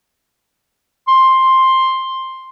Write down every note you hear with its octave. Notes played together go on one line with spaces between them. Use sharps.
C6